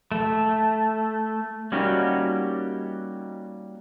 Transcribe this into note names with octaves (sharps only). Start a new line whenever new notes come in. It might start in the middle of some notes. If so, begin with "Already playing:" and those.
A3
G3 A#3 C#4 D#4 F#4 G4